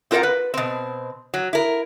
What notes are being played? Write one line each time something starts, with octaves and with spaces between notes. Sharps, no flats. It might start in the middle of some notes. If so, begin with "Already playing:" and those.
C4 F4 A#4 C5 F#5 A#5
B4
B2 C4
F#3
E4 A#4